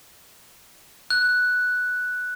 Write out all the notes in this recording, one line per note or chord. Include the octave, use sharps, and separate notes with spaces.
F#6